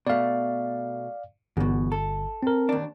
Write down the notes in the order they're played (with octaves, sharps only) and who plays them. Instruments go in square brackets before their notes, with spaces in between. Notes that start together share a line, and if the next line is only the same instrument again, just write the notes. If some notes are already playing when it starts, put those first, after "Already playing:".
[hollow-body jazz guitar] B2 A3 [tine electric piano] D5 F5
[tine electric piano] G1 [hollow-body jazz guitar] E2 B2
[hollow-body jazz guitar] A4
[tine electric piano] C4 A#4
[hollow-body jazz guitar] D#2 D4